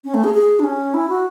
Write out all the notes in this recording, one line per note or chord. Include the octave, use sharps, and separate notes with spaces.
C#4
A3
G#4
G#4
D4
C#4
E4
F#4